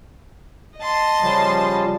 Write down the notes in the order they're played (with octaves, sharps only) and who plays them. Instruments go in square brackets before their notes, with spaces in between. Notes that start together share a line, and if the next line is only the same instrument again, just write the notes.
[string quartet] D#5 A5 C6
[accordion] C#3 F3 G3